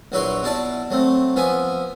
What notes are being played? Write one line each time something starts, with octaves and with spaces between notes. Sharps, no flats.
A#1 F#3 E4 B4 C#5 C6
B2 E4 D5 A5
F#3 A3 C4
F3 B3 E5 G#5